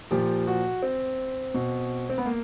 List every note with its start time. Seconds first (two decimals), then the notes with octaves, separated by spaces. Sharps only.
0.11 A#2 F3 G4
0.47 F#4
0.82 C4
1.54 B2
2.10 C4
2.18 B3
2.26 A#3